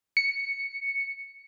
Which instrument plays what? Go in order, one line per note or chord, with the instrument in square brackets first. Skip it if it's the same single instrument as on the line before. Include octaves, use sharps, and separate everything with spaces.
[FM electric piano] C#7